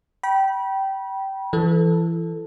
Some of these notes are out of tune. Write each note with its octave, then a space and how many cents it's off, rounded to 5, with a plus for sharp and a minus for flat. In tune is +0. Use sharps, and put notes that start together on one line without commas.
G5 -20 B5 -30
E3 +25 A4 +0